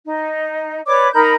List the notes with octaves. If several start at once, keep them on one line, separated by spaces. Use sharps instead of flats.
D#4
B4 C#5 D5 D6
D#4 A#4 B5 G6